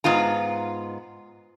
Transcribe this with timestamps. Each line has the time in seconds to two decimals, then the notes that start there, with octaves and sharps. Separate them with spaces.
0.04 G#2 B3 F4 A#5